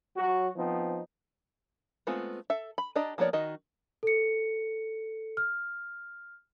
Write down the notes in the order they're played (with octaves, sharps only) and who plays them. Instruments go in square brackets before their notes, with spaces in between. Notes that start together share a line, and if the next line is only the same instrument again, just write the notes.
[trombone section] F#3 F#4
F3 B3 C4 D#4
[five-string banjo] G#3 A3 B3 C4 F4
A4 E5
B5
D4 G4 D5 D#5 A#5
F3 A#3 B3 C#5 D5
D#3 F#4 D#5
[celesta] A4 C#7
F6